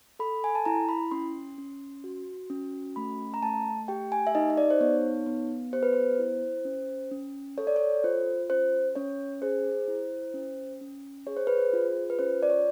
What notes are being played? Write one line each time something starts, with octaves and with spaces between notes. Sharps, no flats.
A4 B5
G#5
A5
E4 A#5
B5
C#4 C6
C#4
F#4
C#4
A3 B5
A#5
A3 A5
G4 G5
G#5
E5
D#4 D#5
D#5
D5
C5
B3 C#5
B3
G4 C5
B4
C5
E4
C#4
C#4
A4 C#5
D5
C#5
F4 C5
C#4 C5
C#4 C#5
G#4 C5
E4
C#4
C#4
G#4 C#5
C5
B4
C5
F4
B4
C#4 C5
D5
C#5